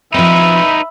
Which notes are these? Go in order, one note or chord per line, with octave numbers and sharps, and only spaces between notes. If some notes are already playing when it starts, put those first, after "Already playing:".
F3 C4 D#4 B4 E5 B5